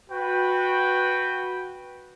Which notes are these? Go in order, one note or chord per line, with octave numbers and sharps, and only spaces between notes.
F#4 B4 G5